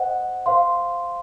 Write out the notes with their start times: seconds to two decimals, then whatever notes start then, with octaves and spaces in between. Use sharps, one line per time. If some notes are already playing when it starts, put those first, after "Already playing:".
Already playing: C5 D#5 F#5
0.46 C5 F5 C6